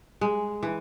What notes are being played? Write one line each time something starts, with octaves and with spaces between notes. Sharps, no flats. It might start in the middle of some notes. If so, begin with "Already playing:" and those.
G#3
E3